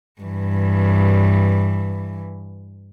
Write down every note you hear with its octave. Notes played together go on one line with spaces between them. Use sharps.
G2 E3